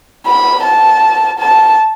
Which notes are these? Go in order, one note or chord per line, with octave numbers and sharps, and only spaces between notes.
B5
A5
A5